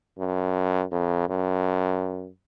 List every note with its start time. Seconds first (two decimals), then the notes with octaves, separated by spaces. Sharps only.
0.18 F#2
0.91 F2
1.29 F#2